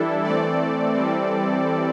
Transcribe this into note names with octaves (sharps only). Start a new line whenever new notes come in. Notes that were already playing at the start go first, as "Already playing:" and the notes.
Already playing: E3 G3 D4 E4 A4
E3 A3 C4 A4 D5
E3 G3 C4